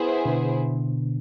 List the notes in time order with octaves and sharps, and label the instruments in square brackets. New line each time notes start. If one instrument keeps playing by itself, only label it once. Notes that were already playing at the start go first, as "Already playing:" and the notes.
Already playing: [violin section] B3 E4 G#4 C5
[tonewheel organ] B2 D3